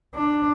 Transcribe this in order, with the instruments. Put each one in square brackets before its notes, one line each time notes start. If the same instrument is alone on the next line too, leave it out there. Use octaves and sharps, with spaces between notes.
[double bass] D4